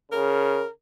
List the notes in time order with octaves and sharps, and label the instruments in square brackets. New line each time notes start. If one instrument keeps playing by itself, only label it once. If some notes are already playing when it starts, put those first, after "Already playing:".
[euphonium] C#3 [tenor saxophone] A#4